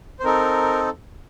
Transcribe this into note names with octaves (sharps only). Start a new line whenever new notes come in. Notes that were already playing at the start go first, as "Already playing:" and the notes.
C5
C4 D#4 A4 A#4